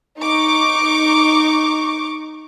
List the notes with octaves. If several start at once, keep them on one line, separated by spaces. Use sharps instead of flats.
D#4 C#6 D6